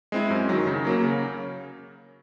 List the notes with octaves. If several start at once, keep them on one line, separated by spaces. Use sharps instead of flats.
G#3 C4 E4
F#2
D#3 F#3
C#3
F#3 A#3 C#4
C#3